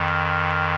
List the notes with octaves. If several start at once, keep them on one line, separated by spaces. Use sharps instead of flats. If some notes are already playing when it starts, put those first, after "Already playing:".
Already playing: F2 D#3